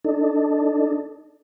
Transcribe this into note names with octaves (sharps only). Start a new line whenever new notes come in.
D4 D#4 A4